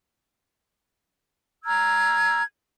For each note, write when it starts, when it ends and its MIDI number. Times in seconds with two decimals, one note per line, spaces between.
1.65 2.43 82
1.65 2.43 88
1.65 2.43 89
1.65 2.43 92